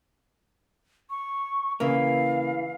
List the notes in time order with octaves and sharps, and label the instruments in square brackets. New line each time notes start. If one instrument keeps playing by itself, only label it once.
[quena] C#6
[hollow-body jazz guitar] C#3 A#3 [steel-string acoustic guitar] E3 [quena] F5